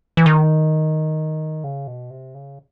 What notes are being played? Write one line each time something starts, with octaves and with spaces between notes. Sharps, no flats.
E3
D#3
C#3
B2
C3
C#3